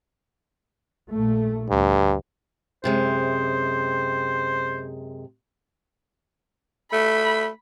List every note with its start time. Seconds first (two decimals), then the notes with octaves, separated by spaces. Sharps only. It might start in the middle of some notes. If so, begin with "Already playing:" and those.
1.12 A#1 A#2 A3
1.70 D2 G2
2.84 F#2 C3 G#3 C5
6.93 A3 B5